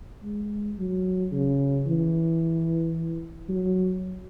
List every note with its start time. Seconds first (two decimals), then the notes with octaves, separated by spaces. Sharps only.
0.23 G#3
0.78 F#3
1.32 C#3
1.87 E3
3.49 F#3